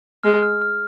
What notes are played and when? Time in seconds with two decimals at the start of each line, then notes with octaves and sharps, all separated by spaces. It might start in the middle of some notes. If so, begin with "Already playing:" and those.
0.23 G#3 F6
0.43 F6
0.61 F6